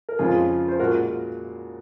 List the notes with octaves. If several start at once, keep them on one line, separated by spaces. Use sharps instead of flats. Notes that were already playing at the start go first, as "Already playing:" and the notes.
A#4
F2 C#3 F3 G#3 F4 G#4
C5
A#2 G#3 F#4 A#4